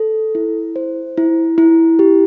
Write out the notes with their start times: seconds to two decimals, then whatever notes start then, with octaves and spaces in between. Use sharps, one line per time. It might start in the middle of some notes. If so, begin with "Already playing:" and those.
Already playing: A4
0.35 E4
0.76 C5
1.17 E4
1.58 E4
1.99 G4